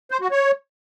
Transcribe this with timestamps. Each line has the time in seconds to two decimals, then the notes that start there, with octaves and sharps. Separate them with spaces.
0.11 C5
0.21 F#4
0.31 C#5